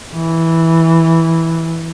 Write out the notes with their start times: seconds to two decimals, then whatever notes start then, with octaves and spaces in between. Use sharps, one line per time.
0.14 E3